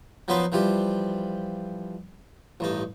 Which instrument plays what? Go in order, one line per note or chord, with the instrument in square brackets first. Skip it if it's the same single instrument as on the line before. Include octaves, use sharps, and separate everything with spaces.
[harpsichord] F3 F#3 B3 D#4 B4 C5
E3 F3 G3 G4
A1 G2 D#4